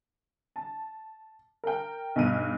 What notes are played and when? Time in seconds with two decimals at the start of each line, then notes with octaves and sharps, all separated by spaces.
0.56 A5
1.64 A#4 G5
2.16 B1 G2 D#7